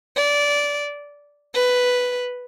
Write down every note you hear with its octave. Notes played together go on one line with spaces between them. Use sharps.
D5
B4